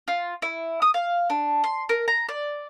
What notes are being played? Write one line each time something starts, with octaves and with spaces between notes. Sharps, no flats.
F4
E4
D#6
F5
D4
C6
A#4
A#5
D5